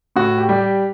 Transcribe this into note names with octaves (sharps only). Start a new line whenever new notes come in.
A2 F#4
G4
G3
G4